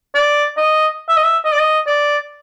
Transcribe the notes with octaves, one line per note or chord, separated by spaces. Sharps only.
D5
D#5
E5
D#5
E5
D#5
D5
D#5
D5